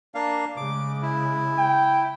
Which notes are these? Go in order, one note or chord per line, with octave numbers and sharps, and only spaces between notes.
A#3 D4 F5
C#3 G#3 D6
E4
G5